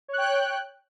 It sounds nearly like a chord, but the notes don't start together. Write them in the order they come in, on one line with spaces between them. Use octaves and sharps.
C#5 F#6 G5